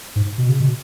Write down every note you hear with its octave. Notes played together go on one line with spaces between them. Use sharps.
G#2
B2
C#3
B2